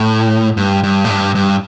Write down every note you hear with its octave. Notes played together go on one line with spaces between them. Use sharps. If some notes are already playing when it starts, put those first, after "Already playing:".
Already playing: A2
G2
G2
A2
G2
G2